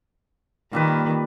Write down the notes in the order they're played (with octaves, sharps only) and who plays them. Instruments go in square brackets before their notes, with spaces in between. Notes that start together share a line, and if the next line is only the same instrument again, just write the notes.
[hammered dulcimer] A#2 G3 B4 [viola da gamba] D#3